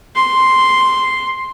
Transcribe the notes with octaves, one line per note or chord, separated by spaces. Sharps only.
C6